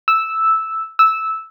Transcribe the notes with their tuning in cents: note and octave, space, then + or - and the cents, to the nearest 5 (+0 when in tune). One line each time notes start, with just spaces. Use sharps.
E6 -5
E6 -10